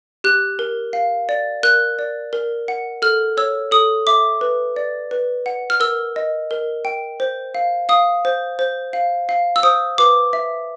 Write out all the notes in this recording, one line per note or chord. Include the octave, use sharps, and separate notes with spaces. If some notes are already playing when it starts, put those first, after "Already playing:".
G4 F#6
A#4
F5
D5
A#4 F#6
D5
A#4
F#5
A4 F6
C#5 E6
A4 D#6
E5 D6
B4
D5
B4
F#5
F6
A#4 E6
D#5
A#4
G5
C5
F5
F5 D#6
C5
C5
F5
F5
E6
C5 D#6
B4 D6
E5